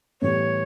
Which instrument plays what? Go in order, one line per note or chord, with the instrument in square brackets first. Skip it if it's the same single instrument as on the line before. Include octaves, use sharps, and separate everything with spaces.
[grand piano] A2 E3 G3 B3 [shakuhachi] C#5